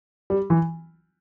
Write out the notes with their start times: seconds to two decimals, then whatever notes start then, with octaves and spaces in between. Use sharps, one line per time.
0.30 G3
0.50 E3